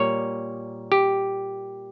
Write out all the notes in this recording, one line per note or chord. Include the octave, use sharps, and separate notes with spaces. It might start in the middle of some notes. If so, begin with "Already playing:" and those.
Already playing: A#2 G3 A#3 C#5
G4